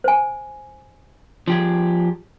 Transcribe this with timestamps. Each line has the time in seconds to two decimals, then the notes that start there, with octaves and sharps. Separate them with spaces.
0.04 C5 G#5
1.48 F3 G4 G#4